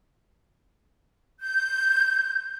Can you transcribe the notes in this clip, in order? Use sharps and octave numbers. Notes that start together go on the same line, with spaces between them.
G6